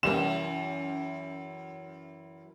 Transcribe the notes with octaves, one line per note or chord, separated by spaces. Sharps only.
F#2 C3 E3 G3 A#3 E7